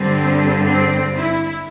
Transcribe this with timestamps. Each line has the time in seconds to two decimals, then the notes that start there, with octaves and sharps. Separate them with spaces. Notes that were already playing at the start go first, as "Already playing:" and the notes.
Already playing: G2 D3 G3 C4
0.66 C4
1.14 E4